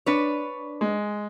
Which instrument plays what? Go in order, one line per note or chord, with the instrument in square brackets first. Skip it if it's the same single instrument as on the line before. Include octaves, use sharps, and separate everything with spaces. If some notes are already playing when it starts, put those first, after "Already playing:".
[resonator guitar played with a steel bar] D4 B4 C#5
[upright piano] G#3